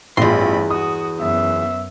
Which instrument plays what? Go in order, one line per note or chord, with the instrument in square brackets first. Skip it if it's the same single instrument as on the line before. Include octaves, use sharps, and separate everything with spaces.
[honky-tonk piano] A1 F4 [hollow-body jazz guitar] E2 C6 [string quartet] G2 B5
[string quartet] F#4 [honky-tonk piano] D#6
[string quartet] F#2 [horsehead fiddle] B3 E5